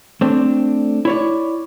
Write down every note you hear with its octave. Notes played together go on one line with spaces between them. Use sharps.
A3 C4 D4
E4 C#5 D5